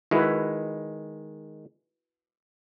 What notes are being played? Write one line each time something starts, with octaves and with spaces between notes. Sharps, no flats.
D#3 G#3 E4 F#4 B4